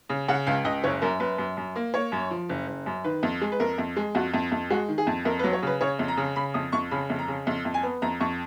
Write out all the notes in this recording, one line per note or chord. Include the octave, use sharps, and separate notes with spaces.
C#3
C#3 F#5
C#2 F5
C#2 D#5
F#1 C#5
F#2 A#4
F#2 B4
F#2
F#2
A#3
A#3 C#5
F#2
F3
F#1
F#1
F#2
D#3 B4
F2
G#3
B4
F2 A#4
F2
G#3
F2 F#4
F2
F2
G#3 F#4
D#3
G#4
F2
F2 A#4
B4
F#3
C#5
C#3 B4
C#3 C#5
F2
A#5
C#3
C#3 B5
F2 D#6
F2 C#6
C#3 B5
F2
A#5
C#3
F2
F2
G#5
B3
F2 A#5
F2 C#6